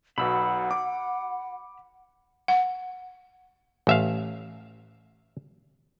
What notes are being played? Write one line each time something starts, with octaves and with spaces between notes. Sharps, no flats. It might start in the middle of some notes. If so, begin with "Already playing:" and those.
B1 B2 F#5 B5 E6
D6
F#5
A1 E5 F5